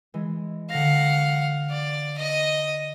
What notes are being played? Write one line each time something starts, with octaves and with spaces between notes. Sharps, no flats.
E3 G#3
D3 F5 F#5 A#6
D5
D#5